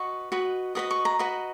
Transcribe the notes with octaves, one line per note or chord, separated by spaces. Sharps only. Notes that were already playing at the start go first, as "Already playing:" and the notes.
Already playing: F#4 B4 D#5 C#6
F#4 B4 D#5
F#4 B4 D#5 D#6
C#6
A#5
F#4 B4 D#5